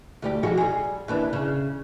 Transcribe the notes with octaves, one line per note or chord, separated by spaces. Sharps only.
D2 G3 G4
F3 G#3 F#4
G3 G#4
D#2 E3 D4
C#3